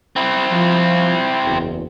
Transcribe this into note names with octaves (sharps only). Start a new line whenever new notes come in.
C4 E4
F3
F#1 E2